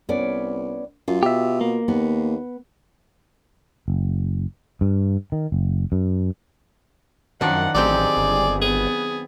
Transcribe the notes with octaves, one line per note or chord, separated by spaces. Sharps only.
C2 B3 C#4 D5
F#2 F4
B2 G4 E5
A#3
D#2 B3
F#1
G2
D#3
F#1
F#2
F#2 D#3 F3 D4 F#5
A1 F#3 C4 G4 G#4 D5
G1
B3 G#4